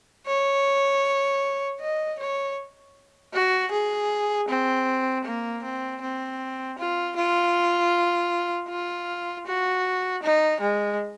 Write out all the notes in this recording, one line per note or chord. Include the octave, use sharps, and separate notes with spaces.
C#5
D#5
C#5
F#4
G#4
C4
A#3
C4
C4
F4
F4
F4
F#4
D#4
G#3